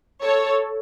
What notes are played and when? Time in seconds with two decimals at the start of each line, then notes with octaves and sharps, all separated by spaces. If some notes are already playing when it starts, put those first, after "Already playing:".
0.23 A4 C#5